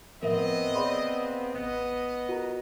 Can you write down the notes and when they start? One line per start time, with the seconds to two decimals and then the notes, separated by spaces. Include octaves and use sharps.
0.23 A2 E3 F3 B3 C4 A#4 D#5 E5
0.75 G#4 C#5 D5 F5 B5 C6
1.54 A1 B3 D#5
2.29 F4 F#4 A#4 A#5